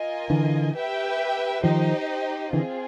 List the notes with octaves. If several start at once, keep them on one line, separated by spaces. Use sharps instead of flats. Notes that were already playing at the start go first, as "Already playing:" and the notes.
Already playing: F4 A#4 D#5 G#5
D3 E3
G4 B4 E5 G5
D#3 F3 D#4 G4 C5 D#5
D3 E3 C4 F4 G#4